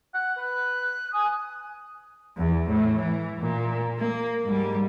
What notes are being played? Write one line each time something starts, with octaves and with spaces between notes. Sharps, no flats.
F#5
B4 F#6
G#5 D#6
E2
A2
E3
A#2
A#3
G#2 G3